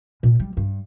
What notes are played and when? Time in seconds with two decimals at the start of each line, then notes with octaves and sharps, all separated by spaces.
0.23 A#2
0.39 G3
0.57 G2